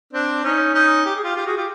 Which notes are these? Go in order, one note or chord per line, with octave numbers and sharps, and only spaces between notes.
C4 D4
C#4 D#4
C#4 D#4
G4
G#4
F4 G4
F4 G4
F#4 G#4
F4 G4